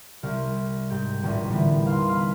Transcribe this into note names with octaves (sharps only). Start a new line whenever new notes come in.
C2 C3 E5 F6
G#2 G4 G6
D#1 A1 C3 C#4 D4 B6
A2 D3 E3 G3 B3
D#2 F5 C6
F5 B5